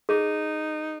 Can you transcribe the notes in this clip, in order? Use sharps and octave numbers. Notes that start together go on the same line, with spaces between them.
D#4 G#4